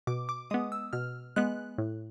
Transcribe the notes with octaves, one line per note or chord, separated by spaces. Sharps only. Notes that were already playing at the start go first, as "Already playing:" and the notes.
B2 D6
D6
G#3 B3 D#6
E6
B2 F6
G#3 B3 F#6
A2